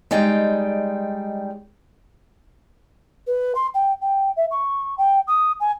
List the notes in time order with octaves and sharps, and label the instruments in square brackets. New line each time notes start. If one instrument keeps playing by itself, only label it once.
[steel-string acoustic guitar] G3 G#3 D#4 D5 G5
[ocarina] B4
C6
G5
G5
E5
C#6
G5
D#6
G#5